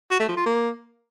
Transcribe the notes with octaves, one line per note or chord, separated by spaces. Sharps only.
F#4
A3
F3
F4
A#3